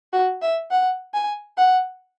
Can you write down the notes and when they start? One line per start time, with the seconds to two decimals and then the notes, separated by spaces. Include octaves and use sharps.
0.13 F#4
0.42 E5
0.71 F#5
1.14 G#5
1.58 F#5